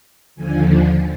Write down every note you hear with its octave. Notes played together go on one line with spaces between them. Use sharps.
D#2 D3 F3 G#5